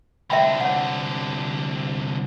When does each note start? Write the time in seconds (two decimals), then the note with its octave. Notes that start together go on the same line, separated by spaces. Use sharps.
0.30 C2 D3 E5 G5 B5
0.61 C#5 F#5